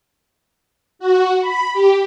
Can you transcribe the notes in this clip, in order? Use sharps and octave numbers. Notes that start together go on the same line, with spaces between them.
F#4
B5
G4